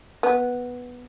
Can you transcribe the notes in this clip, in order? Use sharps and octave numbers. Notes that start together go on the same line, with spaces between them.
B3